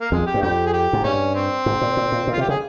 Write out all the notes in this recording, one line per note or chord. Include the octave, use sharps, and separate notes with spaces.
A#3
F2 G#3
G4
G2
F2 G4
G#4
G4
G#2
G2 C#4
C4
G#2
A#2
A#2
A#2
A#2
F4
C3
G4
C#3 G#4